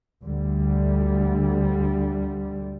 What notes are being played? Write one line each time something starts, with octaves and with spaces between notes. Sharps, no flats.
D2 D3 G3